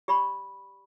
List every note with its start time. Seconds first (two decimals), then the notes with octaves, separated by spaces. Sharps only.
0.08 G4 D5 B5 C#6